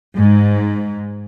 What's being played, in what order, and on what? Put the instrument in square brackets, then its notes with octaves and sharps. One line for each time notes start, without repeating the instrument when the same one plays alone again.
[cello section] G#2